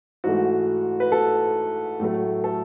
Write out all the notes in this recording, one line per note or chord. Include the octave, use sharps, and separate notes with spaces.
G#2 E3 A3 F#4
B4
A4
A2 F#3 A3
A4